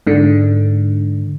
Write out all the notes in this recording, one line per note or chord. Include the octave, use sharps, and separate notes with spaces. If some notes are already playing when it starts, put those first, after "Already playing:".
G#2 D3